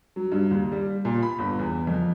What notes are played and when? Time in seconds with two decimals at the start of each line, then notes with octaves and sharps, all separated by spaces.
0.16 F#3
0.32 G2
0.51 D#2
0.72 G3
1.05 A#2
1.22 B5
1.38 G1
1.59 E2
1.87 F2